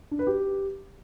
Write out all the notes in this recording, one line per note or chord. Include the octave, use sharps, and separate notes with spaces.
D4
B4
G4